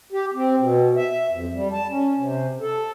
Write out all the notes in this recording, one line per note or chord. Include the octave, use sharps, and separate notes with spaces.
G4
C4
B2
E5
F2
G3
A5
C#4
C3
A4